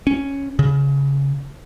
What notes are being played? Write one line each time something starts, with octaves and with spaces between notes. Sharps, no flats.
C#4
C#3